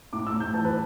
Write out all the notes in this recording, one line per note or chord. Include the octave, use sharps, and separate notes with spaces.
A2 D6
E6
A2
G6
E3 A5
B4